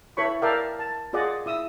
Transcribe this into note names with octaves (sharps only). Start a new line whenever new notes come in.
E4 A4 B4 C#5 B5 C#6
A4 A#4 D5 E5 F5 G5
A5
F4 G#4 D5 D#5 F#5
E4 D#6 E6